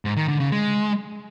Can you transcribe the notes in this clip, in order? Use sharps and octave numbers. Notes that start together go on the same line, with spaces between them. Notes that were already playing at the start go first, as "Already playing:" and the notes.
G#2
D#3
D3
C#3
G#3